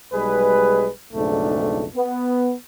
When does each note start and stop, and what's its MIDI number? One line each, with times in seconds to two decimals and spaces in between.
0.13 0.88 35
0.13 0.88 55
0.13 0.88 56
0.13 0.88 68
0.13 0.88 71
1.13 1.86 35
1.13 1.86 41
1.13 1.86 44
1.13 1.86 49
1.13 1.86 57
1.13 1.86 62
1.95 2.53 59